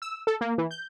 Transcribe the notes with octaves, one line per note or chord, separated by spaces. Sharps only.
E6
A4
A#3
E3
G6